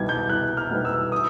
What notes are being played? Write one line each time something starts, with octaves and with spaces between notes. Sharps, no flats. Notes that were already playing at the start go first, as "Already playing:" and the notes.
Already playing: C2 B2 G3 B3 D#4 G#6
G6
C2 F#6
F6
B2 G3 B3 D#4
E6
D#6